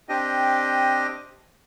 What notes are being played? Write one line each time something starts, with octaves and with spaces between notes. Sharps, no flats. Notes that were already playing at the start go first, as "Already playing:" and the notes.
C4 D4 G4 D#5